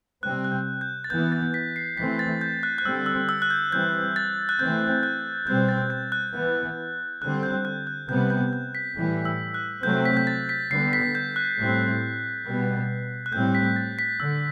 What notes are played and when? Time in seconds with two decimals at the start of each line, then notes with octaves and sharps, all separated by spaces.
0.23 C3 G3 C4 F#6
0.44 F#6
0.52 G6
0.81 G6
1.04 A6
1.10 E3 B3 G6
1.32 A6
1.54 B6
1.76 C7
1.97 E3 A3 C4 B6
2.19 A6
2.41 G6
2.63 F#6
2.78 F#6
2.85 D3 G3 C4 E6
3.06 E6
3.29 E6
3.42 F#6
3.50 G6
3.72 E3 G3 C4 G6
4.16 A6
4.49 F#6
4.59 E3 A3 C4 G6
5.03 F#6
5.47 B2 G3 C4 G6
5.69 A6
5.90 G6
6.12 F#6
6.34 E3 B3
7.22 D3 G3 C4 F#6
7.43 G6
7.65 F#6
7.87 F#6
8.09 C3 G3 B3 G6
8.30 G6
8.53 G6
8.75 B6
8.96 A2 E3 G3
9.25 E6
9.54 F#6
9.83 C3 F#3 A3 C4 G6
10.05 B6
10.17 G6
10.27 A6
10.49 B6
10.71 D3 G3 B3 C7
10.93 B6
11.15 G6
11.36 F#6
11.58 A2 G3 C4
12.46 B2 G3 B3
13.26 F#6
13.32 A2 G3 C4 G6
13.55 B6
13.76 A6
13.99 B6
14.20 D3 E6